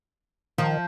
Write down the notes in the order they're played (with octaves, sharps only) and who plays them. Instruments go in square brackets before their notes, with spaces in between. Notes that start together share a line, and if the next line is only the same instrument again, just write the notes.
[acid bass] D#3 [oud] F3